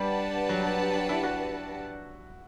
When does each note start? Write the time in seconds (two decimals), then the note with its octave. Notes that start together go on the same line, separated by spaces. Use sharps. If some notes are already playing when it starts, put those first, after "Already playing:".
Already playing: G3 D4 G4 B4 F#5 A5
0.49 F#3
1.09 E4
1.23 F#4